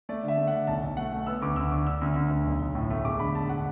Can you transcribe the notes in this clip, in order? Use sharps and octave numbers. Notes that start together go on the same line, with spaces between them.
A3 D5
D3
E5
A3
F#5
D3
B1 A5
B1
A3 F#5
A3
B3 E6
D2 D6
D2 E6
D3 D6
D3 E6
D2
D2
D2
B1
B1
A2
A3
E1 D6
D3 B5
E1 A5
D3 F#5